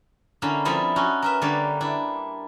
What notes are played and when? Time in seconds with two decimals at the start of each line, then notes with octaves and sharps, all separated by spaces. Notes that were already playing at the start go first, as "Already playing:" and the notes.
0.42 D3 A#3 C#4 E4
0.65 F3 G3 C4 E4 A4 D#5
0.96 C#4 D#4 F#4
1.22 A#4 B4 E5
1.42 D3 G3 A#3 B4 C#5 D5
1.81 D4 E4